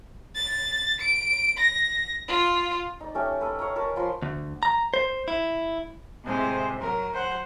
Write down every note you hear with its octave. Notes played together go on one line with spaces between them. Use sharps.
A6
D7
A#6
F4
D#4 D5
A3 C#4 G4
A4 B4
C#5 F5 A#5
A#4 B4 A5 A#5
F3 B4 C6
D2
A#5
C5
E4
A2 C3 G#3 C5
F#3 A#4
C5 F#5